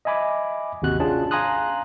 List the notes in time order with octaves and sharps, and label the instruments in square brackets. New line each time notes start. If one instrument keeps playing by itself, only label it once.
[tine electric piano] D#5 E5 G#5 B5 D6
G#1 D#2 C3 F#4 F#6
C#4 D4 F4 G#4 A5
F5 G#5 A#5 C6 D#6 F#6